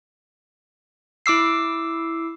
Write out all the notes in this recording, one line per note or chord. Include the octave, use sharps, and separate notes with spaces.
E4 D6 E6 C7